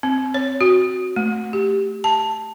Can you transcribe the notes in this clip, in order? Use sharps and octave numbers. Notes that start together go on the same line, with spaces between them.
C4
C#5
F#4
A3
G4
A5